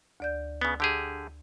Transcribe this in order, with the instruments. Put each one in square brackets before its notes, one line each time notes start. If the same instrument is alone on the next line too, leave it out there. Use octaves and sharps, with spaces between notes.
[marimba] D2 D5 G6
[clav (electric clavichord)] C#3 B3
D3 G4 G#4